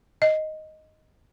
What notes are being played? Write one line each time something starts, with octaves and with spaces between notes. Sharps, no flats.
D#5